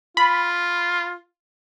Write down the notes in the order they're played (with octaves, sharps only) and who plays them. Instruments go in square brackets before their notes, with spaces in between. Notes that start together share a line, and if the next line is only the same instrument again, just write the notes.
[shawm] F4 [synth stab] B5